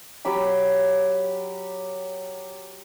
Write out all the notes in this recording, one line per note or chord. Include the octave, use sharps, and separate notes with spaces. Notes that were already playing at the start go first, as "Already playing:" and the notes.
F#3 G4 G5 B5